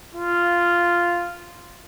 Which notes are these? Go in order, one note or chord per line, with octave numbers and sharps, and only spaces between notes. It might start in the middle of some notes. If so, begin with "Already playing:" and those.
F4